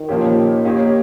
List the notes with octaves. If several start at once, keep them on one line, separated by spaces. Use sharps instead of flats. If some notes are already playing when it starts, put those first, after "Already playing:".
Already playing: D#3
A#2 F3 A#3 C#4 G4
A#3 D#4 G4 C#5